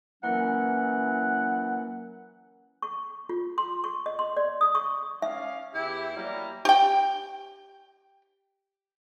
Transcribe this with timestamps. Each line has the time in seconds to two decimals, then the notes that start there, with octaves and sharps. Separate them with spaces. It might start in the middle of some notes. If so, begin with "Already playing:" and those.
0.23 E3 F#3 A#3 C#4 E4 A#4 F#5
2.82 C#6
3.29 F4
3.58 C6
3.84 C#6
4.06 D#5
4.19 C6
4.37 D5
4.61 D#6
4.75 C#6
5.22 C#4 D5 E5 F5
5.75 E2 E4 G4
6.15 F#3 G3 A#3 E4 A#5
6.65 G4 G5